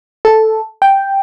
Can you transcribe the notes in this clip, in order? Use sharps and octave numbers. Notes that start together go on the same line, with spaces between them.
A4
G5